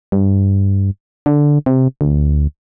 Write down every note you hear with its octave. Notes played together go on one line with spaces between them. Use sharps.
G2
D3
C3
D2